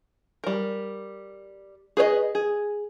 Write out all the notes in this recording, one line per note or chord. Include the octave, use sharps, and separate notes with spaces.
G3 A#4
G#4 B4 C#5 D#5
G#4